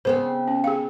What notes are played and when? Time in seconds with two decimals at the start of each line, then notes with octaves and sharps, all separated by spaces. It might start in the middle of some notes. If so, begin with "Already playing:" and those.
0.05 C#3 B3 C4 C5
0.48 C#4
0.64 G#4 F5